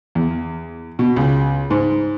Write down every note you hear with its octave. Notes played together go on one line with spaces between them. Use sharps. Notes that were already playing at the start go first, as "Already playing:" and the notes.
E2
B2
C#2
G#2